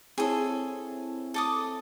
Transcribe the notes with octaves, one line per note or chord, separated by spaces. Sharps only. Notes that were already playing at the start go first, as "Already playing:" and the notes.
C4 E4 G#4 A4 C#5
A4 D6 D#6